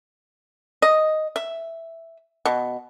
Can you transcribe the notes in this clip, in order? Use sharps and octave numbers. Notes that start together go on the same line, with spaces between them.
D#5
E5
B2